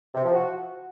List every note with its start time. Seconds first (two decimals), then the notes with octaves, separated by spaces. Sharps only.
0.14 C3
0.24 F3
0.34 F#4